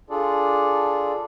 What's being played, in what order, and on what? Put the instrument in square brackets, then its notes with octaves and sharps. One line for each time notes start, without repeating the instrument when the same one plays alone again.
[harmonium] D4 F4 G#4 A4 D5